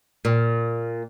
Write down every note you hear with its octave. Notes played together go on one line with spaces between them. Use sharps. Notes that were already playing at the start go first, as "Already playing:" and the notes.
A#2